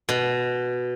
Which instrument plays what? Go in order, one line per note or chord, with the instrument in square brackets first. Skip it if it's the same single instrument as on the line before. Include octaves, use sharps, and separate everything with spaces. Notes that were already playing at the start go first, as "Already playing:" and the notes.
[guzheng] B2